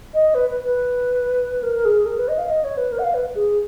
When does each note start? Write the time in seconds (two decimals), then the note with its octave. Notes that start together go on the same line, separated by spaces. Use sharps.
0.14 D#5
0.34 B4
0.50 B4
0.64 B4
1.63 A#4
1.75 A#4
1.85 G#4
2.06 A#4
2.17 B4
2.28 D#5
2.38 F5
2.49 D#5
2.64 C#5
2.77 B4
2.92 A#4
2.99 F#5
3.03 F5
3.14 B4
3.35 G#4